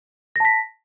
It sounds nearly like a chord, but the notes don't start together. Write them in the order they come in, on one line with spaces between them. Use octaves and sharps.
A#6 A5 B6